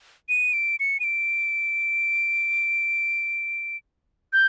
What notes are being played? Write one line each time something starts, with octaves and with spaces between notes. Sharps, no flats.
D#7
D7
C#7
D#7
D7
G6